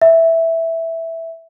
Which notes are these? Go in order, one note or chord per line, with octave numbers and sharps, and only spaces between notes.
E5